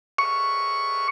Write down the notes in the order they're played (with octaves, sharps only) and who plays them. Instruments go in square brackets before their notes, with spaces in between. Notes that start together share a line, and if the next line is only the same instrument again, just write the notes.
[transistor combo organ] C#6